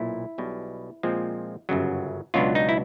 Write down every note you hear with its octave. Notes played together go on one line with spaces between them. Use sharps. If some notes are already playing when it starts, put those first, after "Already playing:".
Already playing: B1 A#2 E4
B1 B2 G3
A#2 F3 G#3 C4
G1 F#2 C#3 F#3
C#2 B2 F#3 B3 D4 F4
D#4
E4